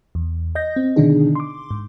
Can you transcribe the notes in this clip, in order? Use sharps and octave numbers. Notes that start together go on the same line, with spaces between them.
E2
D#5 G6 A#6
C4
B2 D3 D#3 D4 D#4 G#4
C6 D6
G#2